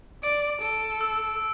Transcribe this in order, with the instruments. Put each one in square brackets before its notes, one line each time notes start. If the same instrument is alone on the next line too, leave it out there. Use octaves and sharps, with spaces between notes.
[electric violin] D5 [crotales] D7
[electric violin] A4 [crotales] D7
[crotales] E6